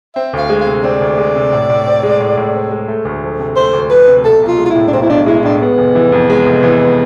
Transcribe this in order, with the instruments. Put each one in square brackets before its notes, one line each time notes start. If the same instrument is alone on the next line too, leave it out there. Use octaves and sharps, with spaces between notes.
[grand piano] C4 [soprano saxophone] E5
[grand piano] D2 [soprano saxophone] F5
[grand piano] G#3
[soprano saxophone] F5
[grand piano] C3
[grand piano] C4 [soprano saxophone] D5
[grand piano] D2
G#3
C3
A2
A2
C4
G#3
A2
A2
C4
G#3
A3
D2
F3
C3
[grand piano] A3 [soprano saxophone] C5
[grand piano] D2
[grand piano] F3 [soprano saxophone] B4
[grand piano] C3
[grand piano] B1 [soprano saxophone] A4
[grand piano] B1
[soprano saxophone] F4
[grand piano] G#3
[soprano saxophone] F4
E4
[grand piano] A2
[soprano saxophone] D4
[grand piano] B1 [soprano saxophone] C4
[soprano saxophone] E4
[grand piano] B1 [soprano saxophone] D4
[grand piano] G#3 [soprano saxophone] E4
[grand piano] A2 [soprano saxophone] D4
[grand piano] G#3 [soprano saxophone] B3
[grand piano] F1
E3
F2
G#3
F1
E3